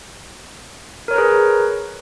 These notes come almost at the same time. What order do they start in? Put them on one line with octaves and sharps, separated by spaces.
A#4 C#5 A#5 B4 G#4